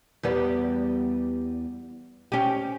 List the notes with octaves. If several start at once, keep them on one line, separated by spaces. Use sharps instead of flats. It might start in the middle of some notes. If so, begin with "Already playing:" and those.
E2 G3 B3
C#4 G4